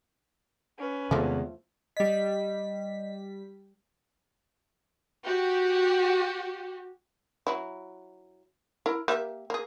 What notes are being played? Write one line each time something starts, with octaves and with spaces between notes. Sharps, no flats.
C#4 B4
E2 C3 D#3 F3 G#3 A3
G3 D#5 B6
F#4 G4
F#3 E4
E4 A#4
A#3 G4 E5
A#3 G#4